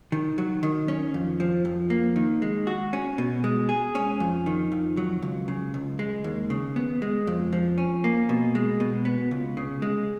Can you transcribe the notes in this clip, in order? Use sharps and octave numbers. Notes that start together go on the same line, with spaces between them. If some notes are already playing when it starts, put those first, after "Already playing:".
D#3
F#3
D#3
C#4
F2
F3
F2
A#3
D#3
G#3
F#4
C#4
B2
G#3
G#4
C#4
F2
D#3
F2
F#3
C#2
C#3
C#2
G#3
D#2
C#3
B3
G#3
F2
F3
C#4
A#3
B2
G#3
B2
B3
C#2
C#3
G#3